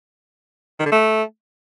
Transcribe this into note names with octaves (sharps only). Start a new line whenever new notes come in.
D#3
D3
A3